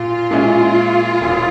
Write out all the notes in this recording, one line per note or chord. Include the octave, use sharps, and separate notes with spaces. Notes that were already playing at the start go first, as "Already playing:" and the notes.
Already playing: A#2 F4
A#2 G#3 C#4 E4
E1 E2 E3